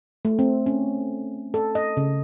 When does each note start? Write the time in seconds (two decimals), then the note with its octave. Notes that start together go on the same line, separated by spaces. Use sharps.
0.25 A3
0.39 C4
0.66 C#4
1.54 A4
1.75 D#5
1.97 C#3